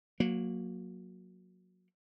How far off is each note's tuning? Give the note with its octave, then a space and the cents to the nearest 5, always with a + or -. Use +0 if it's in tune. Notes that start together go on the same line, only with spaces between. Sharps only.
F#3 -20 A#3 +0